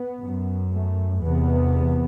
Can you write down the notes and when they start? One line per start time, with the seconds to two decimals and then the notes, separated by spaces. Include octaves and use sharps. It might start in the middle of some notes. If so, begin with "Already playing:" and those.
Already playing: B3
0.21 F#2
0.72 A3
1.23 E2 C3 B3